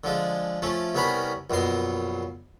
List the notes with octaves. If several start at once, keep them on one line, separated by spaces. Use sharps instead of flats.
D3 F3 G#3
F3 A3 C#4
C2 B3 C#4 A#4 B5
A#1 F#2 B2 C6